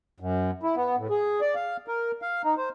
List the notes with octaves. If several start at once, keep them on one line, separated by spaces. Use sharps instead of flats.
F#2
E4
B3
A2
G#4
D5
F5
A#4
F5
D#4
C5